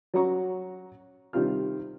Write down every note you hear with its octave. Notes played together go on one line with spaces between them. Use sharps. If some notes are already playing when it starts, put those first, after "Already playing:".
F#3 C#4 F#4 A#5 C#6
C3 D#3 G3 C4 F4 F6